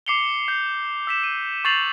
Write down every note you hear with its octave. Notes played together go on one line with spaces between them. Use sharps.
D6 C7 C#7 F7 G7
G6 C7
E6 B6 E7
D#7
C#6 G6 A6 C7 F7 F#7